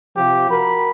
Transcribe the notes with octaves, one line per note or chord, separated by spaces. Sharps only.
C3 F3 G4
F#4 A#4 B5